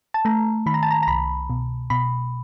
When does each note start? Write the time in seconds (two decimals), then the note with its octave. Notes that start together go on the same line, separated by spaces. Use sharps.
0.14 A5
0.25 A3 A#5
0.66 D#3 B5
0.74 A#5
0.83 A5
0.91 A#5
1.03 A#5
1.07 C2 B5
1.50 B2
1.90 B2 B5